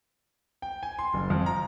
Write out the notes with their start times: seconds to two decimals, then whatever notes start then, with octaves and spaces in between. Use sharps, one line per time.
0.62 G5
0.83 G#5
0.99 C6
1.14 F#1
1.30 F2
1.46 A#5